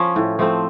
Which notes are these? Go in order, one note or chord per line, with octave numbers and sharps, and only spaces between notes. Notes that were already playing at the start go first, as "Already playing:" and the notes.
Already playing: F3 C#4
A2
F3 A3 C4